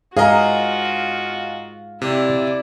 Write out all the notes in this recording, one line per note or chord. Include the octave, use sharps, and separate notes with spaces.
G#2 F4 F#4 G#4 A#4 D#5 F5 A#5
C3 E4 D5